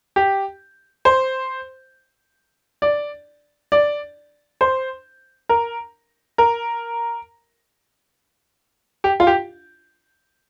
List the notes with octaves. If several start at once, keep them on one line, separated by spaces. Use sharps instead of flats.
G4
C5
D5
D5
C5
A#4
A#4
G4
F4
G4